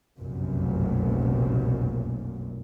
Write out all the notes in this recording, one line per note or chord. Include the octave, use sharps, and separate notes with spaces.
F1 B1 F#2 A#2